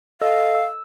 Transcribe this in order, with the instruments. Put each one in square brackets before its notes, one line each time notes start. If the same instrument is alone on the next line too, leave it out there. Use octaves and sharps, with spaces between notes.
[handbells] A4 D#5 E6 [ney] F5
[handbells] E6